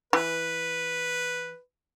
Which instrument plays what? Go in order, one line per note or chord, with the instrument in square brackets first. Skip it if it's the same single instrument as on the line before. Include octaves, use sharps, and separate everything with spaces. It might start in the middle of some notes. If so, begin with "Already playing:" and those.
[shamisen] E3 [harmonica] B4